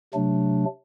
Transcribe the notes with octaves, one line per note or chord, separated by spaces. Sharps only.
C3 F#3 A3 D4